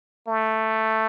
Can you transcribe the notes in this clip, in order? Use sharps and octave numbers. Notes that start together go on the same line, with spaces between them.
A3